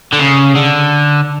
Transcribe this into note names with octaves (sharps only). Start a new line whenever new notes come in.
D3
C#3
D3